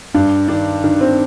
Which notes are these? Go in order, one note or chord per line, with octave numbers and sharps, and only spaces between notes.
G2 D4
D#3 D4
D#3 D4
C4